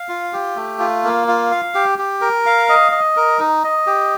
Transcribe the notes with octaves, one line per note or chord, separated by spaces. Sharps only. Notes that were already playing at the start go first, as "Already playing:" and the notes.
Already playing: F5
F4
G4
A3
F4
A#3
F4
F5
G4
G4
A#4
F5
D#5
D#5
A#4
D#4
D#5
G4